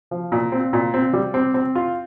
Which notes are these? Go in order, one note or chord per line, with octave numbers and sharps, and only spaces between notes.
F3
A#2
C4
A#2
C4
G3
C4
C4
F4